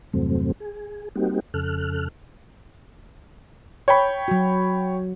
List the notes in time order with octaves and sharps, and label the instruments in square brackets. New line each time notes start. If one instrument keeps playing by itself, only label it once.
[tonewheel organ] E2 G2 C3 F#3 A3 C4
G#4
G3 A#3 C4 D#4 F#4 G4
F2 C#3 A4 F6 F#6
[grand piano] C#5 G5 B5
[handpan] F#3 F#4